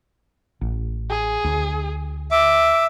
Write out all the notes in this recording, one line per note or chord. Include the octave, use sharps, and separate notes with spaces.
A1
G#4
D2
E5 D6